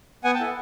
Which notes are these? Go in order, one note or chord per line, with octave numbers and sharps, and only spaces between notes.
B3 F#5 G#5
G5 A5
E4 A4